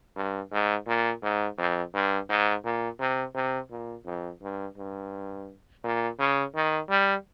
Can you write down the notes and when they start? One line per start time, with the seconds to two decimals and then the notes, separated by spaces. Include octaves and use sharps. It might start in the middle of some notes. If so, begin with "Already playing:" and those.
0.16 G2
0.51 G#2
0.87 A#2
1.22 G#2
1.58 F2
1.94 G2
2.29 G#2
2.64 A#2
3.00 C3
3.35 C3
3.71 A#2
4.06 F2
4.42 G2
4.78 G2
5.84 A#2
6.19 C#3
6.55 D#3
6.90 G3